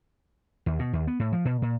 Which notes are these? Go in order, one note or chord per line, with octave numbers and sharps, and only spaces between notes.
D#2
B2
D#2
B3
A2
F3
B2
A#2